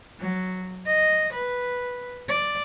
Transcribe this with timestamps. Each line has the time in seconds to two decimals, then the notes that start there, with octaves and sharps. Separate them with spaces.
0.20 F#3
0.86 D#5
1.33 B4
2.29 D5